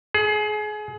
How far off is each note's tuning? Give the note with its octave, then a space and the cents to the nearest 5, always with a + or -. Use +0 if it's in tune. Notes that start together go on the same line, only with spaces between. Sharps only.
G#4 +30